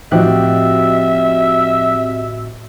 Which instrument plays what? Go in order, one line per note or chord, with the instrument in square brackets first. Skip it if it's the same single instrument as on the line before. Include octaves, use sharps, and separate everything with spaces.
[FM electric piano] A2 F#4 D#5 [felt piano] F3 [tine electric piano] C4 G4 F#6 [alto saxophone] E5